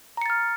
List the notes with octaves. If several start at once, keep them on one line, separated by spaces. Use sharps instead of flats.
A#5 F6 A6 C#7